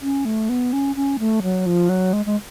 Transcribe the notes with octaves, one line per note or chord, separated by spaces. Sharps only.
C#4
A3
B3
C#4
C#4
A3
F#3
F3
F#3
G#3
G#3